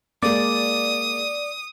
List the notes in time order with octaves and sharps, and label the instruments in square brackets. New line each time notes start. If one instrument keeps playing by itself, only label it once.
[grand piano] G#3 A#3 [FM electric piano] D5 [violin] D#6